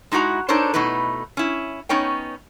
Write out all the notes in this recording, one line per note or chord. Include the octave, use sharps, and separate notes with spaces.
G#3 D#4 E4 F#4 A#5
D4 D#4 A4 A#4 C5 C#5
B2 A3 D#4 E4 B4
C#4 E4
B3 C#4 D#4 C#5 G5